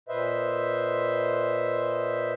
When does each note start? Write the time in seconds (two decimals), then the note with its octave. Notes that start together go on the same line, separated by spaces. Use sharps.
0.09 A#2 B4 C5 D#5 E5